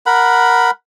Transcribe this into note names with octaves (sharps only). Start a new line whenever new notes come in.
A#4 F#5 B5